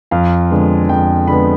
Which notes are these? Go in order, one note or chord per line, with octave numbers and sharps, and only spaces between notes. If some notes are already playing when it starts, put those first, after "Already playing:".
F2 F5
D3 G#3 B3
F2 G5
D3 G#3 B3 B5